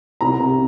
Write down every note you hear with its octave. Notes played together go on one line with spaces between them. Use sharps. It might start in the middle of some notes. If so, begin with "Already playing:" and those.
C2 A#5
C3